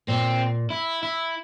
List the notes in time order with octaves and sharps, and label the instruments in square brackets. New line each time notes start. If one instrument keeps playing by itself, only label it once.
[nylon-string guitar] A#2 A#3 [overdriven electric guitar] C4
[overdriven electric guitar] E4
E4